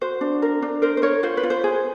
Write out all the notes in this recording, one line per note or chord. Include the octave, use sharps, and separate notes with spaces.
F#4 C5
D4
A#4
D4
A#4 C5
C5
A#4 C#5
F4 C5
B4
F4
C5
G#4